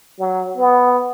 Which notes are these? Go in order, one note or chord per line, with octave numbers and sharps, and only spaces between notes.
F#3
B3